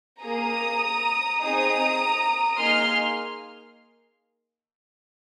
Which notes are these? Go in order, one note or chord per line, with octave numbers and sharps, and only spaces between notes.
A#3 G#4 A#5 D#6
C4 D#4 G#4 A#5 D#6
A#3 D#4 G#4 C6 F6